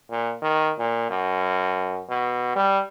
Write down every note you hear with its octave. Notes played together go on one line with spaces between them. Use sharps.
A#2
D#3
A#2
F#2
B2
G3